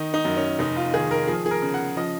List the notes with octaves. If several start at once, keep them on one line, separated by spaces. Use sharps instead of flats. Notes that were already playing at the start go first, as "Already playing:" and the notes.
Already playing: D#3 D#4
D#4
F#2
C#4
F1 D#4
F4
D#3 G#4
A#4
F3 G#4
G#4
A#4
C#3
F#5
F3 D#5